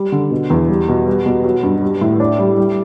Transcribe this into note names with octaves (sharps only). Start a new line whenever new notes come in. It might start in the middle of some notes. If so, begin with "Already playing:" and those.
Already playing: G3
D3
B2
E2
G3
B2
G3
B2
F#3
G2
G3
A2
D4
G3
G3